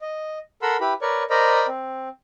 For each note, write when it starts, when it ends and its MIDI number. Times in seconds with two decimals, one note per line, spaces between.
0.01 0.39 75
0.62 0.77 69
0.62 0.77 70
0.62 0.77 78
0.62 0.77 83
0.62 0.77 84
0.62 0.77 88
0.81 0.93 64
0.81 0.93 67
0.81 0.93 71
0.81 0.93 83
1.02 1.23 70
1.02 1.23 71
1.02 1.23 73
1.02 1.23 74
1.02 1.23 85
1.30 1.67 70
1.30 1.67 72
1.30 1.67 74
1.30 1.67 75
1.30 1.67 82
1.30 1.67 83
1.68 2.09 60